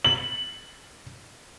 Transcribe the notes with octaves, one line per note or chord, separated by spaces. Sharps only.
F#7